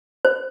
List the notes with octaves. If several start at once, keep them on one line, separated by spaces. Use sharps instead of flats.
C5